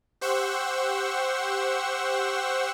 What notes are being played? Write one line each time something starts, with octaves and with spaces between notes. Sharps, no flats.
G4 C5 F#5 C#6 E6